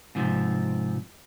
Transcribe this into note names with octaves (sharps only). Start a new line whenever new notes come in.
G#2 C3 F3